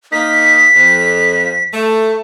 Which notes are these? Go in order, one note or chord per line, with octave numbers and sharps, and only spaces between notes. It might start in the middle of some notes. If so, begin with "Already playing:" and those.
A#3 D#4 B6
F2
A3